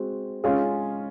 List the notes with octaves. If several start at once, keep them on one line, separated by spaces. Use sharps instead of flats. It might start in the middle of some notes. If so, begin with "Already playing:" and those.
Already playing: G#3 C4 F#4
G#3 C#4 F4 G#4